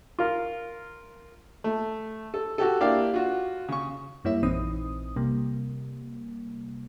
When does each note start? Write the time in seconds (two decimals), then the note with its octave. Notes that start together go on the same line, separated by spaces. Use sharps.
0.19 F4 A#4
1.64 A3
2.34 A4
2.58 F#4 G4 A4
2.80 A#3 D4 E4 G4 D5 F5
3.14 F4 F#4
3.69 C#3 C#6
4.24 F#2 G3 A#3 E4 C#5 E5
4.43 A#1 E3 C4 D#4 D#6
5.16 C3 G3 A#3